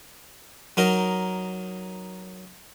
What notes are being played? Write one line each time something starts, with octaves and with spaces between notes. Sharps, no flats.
F#3 D#4 A#4